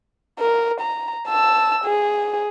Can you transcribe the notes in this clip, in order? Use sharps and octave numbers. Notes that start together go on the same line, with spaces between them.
A#4
A#5
A5 E6
G#4